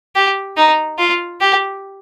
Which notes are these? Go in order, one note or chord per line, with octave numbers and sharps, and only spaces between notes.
G4
D#4
F4
G4